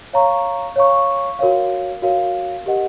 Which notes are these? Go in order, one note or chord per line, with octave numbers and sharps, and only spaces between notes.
C#5 F5 A#5 C#6
C#5 F5 A#5 C#6
F#4 A#4 C#5 F5
F#4 A#4 C#5 F5
G4 A#4 D#5 F#5